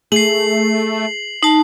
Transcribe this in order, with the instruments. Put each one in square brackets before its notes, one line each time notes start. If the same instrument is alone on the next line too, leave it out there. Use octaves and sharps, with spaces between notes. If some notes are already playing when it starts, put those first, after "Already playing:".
[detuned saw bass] A3 [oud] G#4 [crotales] C7 F#7
[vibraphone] D#4 A5 [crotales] C7